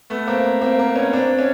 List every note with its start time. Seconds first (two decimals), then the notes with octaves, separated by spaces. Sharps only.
0.10 A3 B3
0.27 A#3 C4
0.61 A#3 C4
0.79 A#3 C4
0.96 B3 C#4
1.13 C4 D4
1.39 C#4